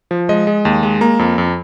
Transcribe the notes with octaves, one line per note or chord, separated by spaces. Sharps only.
F3
G#3 D#5
G#3
D#2
G#3
A#3 A#5
F2
F2